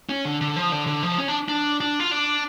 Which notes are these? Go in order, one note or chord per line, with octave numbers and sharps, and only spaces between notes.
C#4
D3
D3
F3
D3
D3
F3
C#4
D4
D4
D4
F4
D4